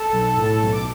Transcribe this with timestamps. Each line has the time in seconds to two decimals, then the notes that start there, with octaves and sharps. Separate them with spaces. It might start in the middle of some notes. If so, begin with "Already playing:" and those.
Already playing: A4 A5
0.12 B1
0.37 A2
0.61 B1
0.72 D6